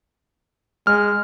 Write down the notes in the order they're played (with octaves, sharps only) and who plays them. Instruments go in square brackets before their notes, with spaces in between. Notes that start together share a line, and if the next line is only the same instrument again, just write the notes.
[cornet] G#3 [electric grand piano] F6